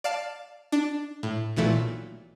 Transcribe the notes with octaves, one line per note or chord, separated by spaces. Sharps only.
D5 F5 A5
D4
A2
B1 A#2 E3 A3